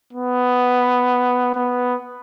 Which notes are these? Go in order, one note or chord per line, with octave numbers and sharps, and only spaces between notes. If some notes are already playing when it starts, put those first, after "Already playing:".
B3
B3